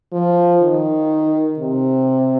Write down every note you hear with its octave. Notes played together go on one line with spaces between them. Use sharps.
F3
D#3
C3